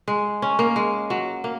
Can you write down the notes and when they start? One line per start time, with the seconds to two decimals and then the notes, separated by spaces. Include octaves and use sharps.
0.08 G#3
0.42 C#4
0.59 A#3
0.76 G#3
1.10 F#3
1.44 A#3